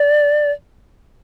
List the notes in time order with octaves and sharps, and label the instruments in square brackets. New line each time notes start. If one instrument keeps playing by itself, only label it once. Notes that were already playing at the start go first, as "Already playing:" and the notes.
Already playing: [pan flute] D5